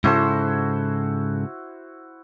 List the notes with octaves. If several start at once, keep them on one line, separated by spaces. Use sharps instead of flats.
G#2 C#3 E4 F#4 A4 C5